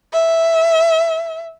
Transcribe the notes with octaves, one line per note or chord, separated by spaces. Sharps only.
E5